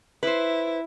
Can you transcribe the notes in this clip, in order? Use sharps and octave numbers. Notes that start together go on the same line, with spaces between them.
E4 B4 C5